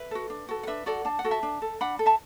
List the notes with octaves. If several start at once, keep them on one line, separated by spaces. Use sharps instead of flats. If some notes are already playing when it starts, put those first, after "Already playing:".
Already playing: B4 E5
F#4 A4
D4
F#4 A4
F#5
D4 B4 E5
F#4 A4 D5 F#5
D4 A5
F#5
F#4 A4
E5 A5
D4
A4
D4 F#5 B5
A4
E5 A5